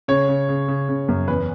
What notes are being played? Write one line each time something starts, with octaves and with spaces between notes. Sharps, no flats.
C#3 C#5
C#3
C#3
C#3
C#3
F#2
E2 B4